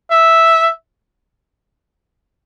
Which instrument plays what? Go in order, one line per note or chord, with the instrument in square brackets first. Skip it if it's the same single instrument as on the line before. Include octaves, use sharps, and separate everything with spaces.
[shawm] E5